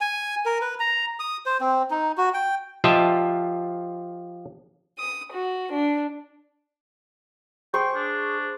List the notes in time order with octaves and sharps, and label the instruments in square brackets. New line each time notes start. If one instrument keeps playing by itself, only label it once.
[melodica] G#5
A#4
B4
A#5
D#6
C5
C4
D#4
F#4
G5
[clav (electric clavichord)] F3 F4 G4 D#5 E5 A5
[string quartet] D#6
F#4
D4
[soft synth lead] G#4 [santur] C5 C#6 [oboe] G5
[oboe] D4